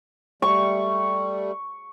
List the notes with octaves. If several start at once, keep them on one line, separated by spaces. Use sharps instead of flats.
G3 A3 C#6